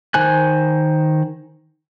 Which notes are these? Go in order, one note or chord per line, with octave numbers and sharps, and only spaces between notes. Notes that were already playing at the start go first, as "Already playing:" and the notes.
D#3 C5 G#5 F#6